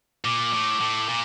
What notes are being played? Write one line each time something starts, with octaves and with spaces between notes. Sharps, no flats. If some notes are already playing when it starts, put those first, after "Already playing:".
A#2 D6
A2
A2
A#2